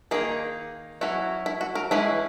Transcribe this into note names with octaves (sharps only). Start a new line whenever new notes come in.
D#3 A#3 D#4 G#4
F#3 C#4 E4 F#4
E4
F#4
A#4
E3 G#3 C#4 E4 B4